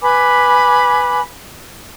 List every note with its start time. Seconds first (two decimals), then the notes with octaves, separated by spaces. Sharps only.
0.02 B4 G#5 B5 D6